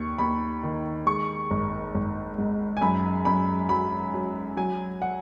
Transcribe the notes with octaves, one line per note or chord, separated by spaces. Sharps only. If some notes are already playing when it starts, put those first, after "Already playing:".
Already playing: D#2 C#6
D#2 B5
D#3
G#3 C#6
G#1
G#1
G#2
G#5
F#2 B5
F#2 B5
F#3 B5
F#3
F#3 G#5
F#5